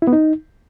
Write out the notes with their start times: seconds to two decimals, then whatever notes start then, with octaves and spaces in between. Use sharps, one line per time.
0.02 E4
0.07 B3
0.13 D#4